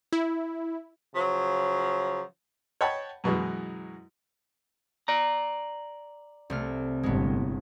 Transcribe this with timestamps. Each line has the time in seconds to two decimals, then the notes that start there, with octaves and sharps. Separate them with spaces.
0.12 E4
1.14 C#3 F3 F#3
2.81 C#5 D#5 F#5 G5 A5 B5
3.24 F#2 B2 E3 G#3
5.08 D5 A#5
6.50 C2 A3 F6
7.03 G1 A2 G#3 B3